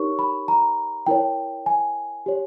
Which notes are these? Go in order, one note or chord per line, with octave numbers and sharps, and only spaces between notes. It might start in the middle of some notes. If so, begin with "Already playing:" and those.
Already playing: D#4 G4 A#4 C#5 C#6
B5
A#5
E4 A#4 C#5 G5
G#5
G4 C#5